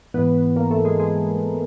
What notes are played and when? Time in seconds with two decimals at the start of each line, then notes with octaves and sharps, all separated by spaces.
0.14 G#2 E3 B3 B4
0.56 A#3 A#4
0.71 A3 A4
0.85 G#3 G#4
1.00 G#3 G#4